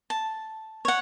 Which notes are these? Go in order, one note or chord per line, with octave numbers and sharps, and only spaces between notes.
A5
C#5 F#5